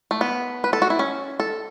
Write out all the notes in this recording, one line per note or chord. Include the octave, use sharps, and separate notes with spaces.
A3
B3
B4
A4
F#4
E4
C#4
A4